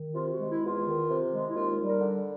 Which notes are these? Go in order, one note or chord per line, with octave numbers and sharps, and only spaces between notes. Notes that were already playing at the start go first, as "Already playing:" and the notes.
Already playing: D#3
C3 F4
F#4
G#3
E4
E2 F4
D#3
C3
G#3
E4
D#2 F4
G3
A#4
D3